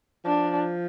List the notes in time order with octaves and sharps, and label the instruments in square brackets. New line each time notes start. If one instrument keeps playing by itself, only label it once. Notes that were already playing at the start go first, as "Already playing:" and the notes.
[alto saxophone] F3 [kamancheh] D4